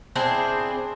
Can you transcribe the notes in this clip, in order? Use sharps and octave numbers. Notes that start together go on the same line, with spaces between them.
C4 D4 E4 G#4